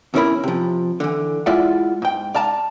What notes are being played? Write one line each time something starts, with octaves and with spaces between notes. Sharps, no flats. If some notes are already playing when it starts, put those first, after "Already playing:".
E2 E3 C#4 E4 A#4 B5
C3 F3
D3 E3
G#3 E4 F4 D5 E5 F#5
G#2 G5
D5 F5 A5 A#5